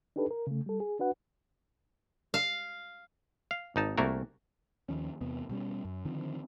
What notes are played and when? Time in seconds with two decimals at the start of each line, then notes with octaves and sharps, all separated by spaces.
0.16 D4 D#4 G4 A4 B4
0.31 A#4
0.47 C#3 A3
0.66 G3 A4
0.80 G#4
1.00 D4 F#4 B4 F#5
2.34 F5
3.51 F5
3.76 G#1 D#4 A5
3.98 C2 A3 A#3 F#4 A#4
4.89 D#2 D#3 F3 C#4
5.21 E2 C3 B3
5.49 B2 G3 C#4
5.85 F#2
6.05 D3 D#3 F3 C4